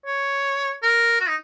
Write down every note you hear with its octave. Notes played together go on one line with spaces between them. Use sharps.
C#5
A#4
F#4
D#4